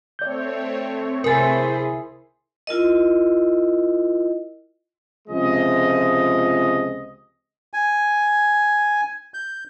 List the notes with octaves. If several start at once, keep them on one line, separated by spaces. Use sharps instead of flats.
A3 C4 C#5 D5 G6
C2 C3 E4 G#4 A#4 C5 G#5 A6
E4 F4 A#4 D#5
C#2 C3 F3 G#3 D#5
G#5
G6